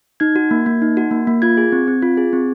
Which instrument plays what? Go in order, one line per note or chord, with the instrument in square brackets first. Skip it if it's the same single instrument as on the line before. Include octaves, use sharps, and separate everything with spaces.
[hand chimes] D#4 G#6
F#4
A#3
A#3
D#4
F#4
A#3
A#3
F4 G#6
G#4
C4
C4
F4
G#4
C4